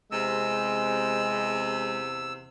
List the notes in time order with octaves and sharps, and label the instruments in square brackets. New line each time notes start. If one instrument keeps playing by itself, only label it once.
[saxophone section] E2 C3 [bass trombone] G#3 [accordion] E6